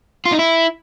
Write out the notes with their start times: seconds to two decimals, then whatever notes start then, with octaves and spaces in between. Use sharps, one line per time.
0.25 F4
0.32 D#4
0.39 E4